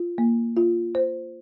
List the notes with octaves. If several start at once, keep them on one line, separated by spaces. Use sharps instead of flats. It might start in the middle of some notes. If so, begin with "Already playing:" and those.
Already playing: F4
A#3
F4
C5